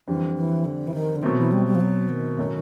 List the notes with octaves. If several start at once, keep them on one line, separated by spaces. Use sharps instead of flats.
F2 D3 E3 G3
E3
D3
E3
D#3
D3
B2 D#3 F#3 A3 C4
E3
G3
G3
F3
F#3
D#3
A2 F#3 A3 C#4